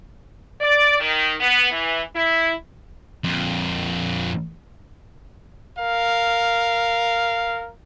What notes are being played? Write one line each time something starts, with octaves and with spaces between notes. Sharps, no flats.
D5
D#3
B3
E3
E4
F2 A#2
A#4 F5